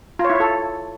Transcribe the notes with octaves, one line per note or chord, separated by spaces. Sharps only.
F4
C#5
E4
C#5
A4